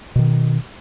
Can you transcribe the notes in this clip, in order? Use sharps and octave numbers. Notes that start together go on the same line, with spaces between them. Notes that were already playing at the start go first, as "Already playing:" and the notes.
B2 D#3